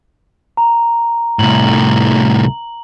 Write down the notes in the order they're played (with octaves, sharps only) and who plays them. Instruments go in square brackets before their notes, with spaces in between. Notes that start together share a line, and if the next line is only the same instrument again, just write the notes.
[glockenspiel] A#5
[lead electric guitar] C2 A2 [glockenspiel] F#7